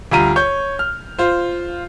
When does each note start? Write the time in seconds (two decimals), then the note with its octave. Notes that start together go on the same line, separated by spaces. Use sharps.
0.11 D2 G3 F4 A#5 D#7
0.36 C#5 G6
0.79 F6
1.19 F4 C5